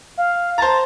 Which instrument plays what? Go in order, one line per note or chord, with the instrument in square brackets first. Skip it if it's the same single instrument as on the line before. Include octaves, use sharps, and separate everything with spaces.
[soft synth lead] F5
[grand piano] C5 A5 A#5 [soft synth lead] A6